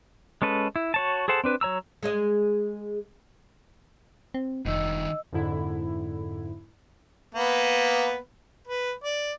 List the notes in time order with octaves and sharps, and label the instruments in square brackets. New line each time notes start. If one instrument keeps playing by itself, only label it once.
[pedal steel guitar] G#3 C#4 A4 B4
E4
F#4 C#5 A5
G#4 A4 C5 F#5 A5
C4 D4 B4
F#3 C#5 A#5 E6
[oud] G#3 G#4 D#5
[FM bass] C4
[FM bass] F1 [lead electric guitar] G2 D#3 [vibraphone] D#5 E6
[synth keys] F2 G#2 D3 E4
[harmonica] A#3 B3 B4
B4
D5